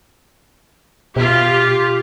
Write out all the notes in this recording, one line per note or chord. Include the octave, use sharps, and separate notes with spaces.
B2 F4 G4